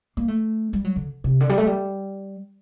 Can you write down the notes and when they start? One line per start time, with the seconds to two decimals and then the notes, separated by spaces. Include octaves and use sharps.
0.17 A#3
0.28 A3
0.73 G3
0.84 F#3
0.96 D3
1.24 C3
1.40 D3
1.49 G3
1.58 A3
1.66 G3